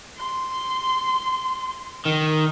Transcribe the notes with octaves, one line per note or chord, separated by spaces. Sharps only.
C6
D#3